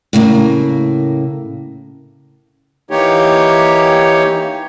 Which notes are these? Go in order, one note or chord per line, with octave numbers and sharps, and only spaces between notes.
A2 C#3 A#3
E3 A#3 D#4 G4 C#5